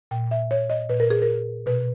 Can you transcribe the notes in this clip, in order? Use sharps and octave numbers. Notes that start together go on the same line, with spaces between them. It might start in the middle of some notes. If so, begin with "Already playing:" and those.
A#2 G5
E5
C#5
D#5
A#2 B4
A#4
G#4
A#4
B2 B4